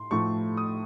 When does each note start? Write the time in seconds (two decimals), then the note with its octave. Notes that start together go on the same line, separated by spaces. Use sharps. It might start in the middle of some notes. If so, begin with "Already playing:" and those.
Already playing: A2 C6
0.11 A2 F3 A3 C#6
0.57 D#6